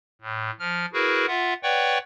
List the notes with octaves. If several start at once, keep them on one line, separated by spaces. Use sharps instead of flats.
A2
F3 F6
E4 F#4 G#4 A#4 B4
F4 E5 F#5
B4 C#5 D5 F#5 G5 C#6